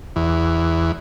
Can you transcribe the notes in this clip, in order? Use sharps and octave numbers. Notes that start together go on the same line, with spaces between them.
E2